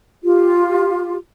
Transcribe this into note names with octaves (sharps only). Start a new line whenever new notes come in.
F4 G4